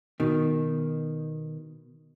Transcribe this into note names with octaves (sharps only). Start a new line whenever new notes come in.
B2 D#3